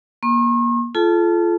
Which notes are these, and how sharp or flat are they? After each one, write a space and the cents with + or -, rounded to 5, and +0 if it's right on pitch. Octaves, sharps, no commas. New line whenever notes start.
A#3 +25 C#6 -45
F4 -20 A4 -40 A5 +0